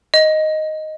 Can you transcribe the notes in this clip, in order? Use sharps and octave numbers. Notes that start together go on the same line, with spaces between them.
D#5